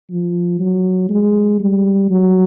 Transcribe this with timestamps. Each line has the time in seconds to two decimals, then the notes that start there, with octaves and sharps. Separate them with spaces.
0.10 F3
0.59 F#3
1.09 G#3
1.60 G3
2.10 F#3